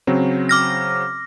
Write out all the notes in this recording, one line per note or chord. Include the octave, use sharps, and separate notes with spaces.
C#3 F#3 C4
D6 F6 A#6